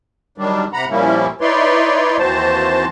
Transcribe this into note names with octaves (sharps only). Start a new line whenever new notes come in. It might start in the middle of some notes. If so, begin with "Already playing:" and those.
D#3 F#3 G3 D4
C3 F#5 A#5 B5
A#2 F3 G3 A#3 C#4 E4
D#4 E4 B4 C#5 D5 C6
D#2 E3 C4 F#4 C5 A5